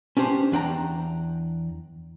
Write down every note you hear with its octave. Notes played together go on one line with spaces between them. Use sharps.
C#4 D4 G4 C5
E2 D4 G5 A#5